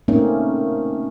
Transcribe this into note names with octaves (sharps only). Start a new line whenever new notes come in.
A3 A#3 C4 C#4 D#4